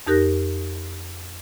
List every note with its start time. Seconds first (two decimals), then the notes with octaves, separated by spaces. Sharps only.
0.07 F2 D#4 G4 A#4 F#6 A#6